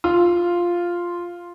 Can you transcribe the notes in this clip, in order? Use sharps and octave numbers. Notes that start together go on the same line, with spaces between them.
F4